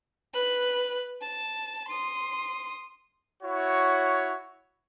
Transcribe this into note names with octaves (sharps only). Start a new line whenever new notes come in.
B4 F#6
A5
C6 D#6
E4 F#4 C#5